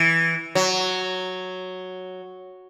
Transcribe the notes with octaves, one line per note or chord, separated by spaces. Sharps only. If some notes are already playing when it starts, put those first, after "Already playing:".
Already playing: E3
F#3